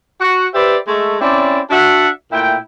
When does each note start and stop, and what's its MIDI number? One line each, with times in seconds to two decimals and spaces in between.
0.21 0.45 66
0.54 0.78 67
0.54 0.78 71
0.54 0.78 72
0.54 0.78 74
0.54 0.78 76
0.87 1.16 56
0.87 1.16 57
1.21 1.60 60
1.21 1.60 61
1.21 1.60 64
1.21 1.60 74
1.70 2.09 62
1.70 2.09 66
1.70 2.09 76
1.70 2.09 78
1.70 2.09 81
2.32 2.57 46
2.32 2.57 57
2.32 2.57 64
2.32 2.57 79